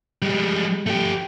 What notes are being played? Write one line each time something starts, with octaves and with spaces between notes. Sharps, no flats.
G3 G#3
A3 G4